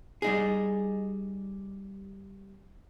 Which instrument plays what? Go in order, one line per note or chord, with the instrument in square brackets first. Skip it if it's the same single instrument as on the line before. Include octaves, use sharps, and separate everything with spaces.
[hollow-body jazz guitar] G3 D#4 G#4